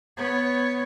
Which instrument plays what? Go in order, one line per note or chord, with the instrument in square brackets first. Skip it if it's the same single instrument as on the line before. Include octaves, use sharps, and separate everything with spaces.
[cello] B3 C#5